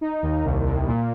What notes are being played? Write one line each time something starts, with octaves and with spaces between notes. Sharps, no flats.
D#4
D#2
C2
C2
A#2